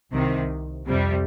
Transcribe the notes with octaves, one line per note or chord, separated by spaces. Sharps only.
C2 C3 D#3
F2 C3 G3